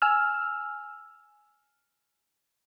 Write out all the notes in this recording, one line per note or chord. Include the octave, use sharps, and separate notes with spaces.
G#5 E6 F6